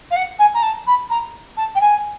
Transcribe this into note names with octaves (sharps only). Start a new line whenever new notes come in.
F5
F#5
G#5
A#5
A5
B5
A#5
A5
G5
G#5